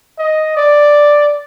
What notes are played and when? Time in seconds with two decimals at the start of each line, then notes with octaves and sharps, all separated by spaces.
0.19 D#5
0.57 D5